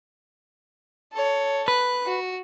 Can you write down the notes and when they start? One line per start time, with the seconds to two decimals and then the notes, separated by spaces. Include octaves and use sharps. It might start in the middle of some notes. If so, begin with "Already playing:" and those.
1.12 A4 C#5
1.68 B4 F#6
2.06 F#4